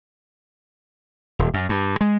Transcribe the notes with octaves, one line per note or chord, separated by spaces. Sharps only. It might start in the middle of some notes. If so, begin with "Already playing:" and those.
D#1
F#2
G2
G#3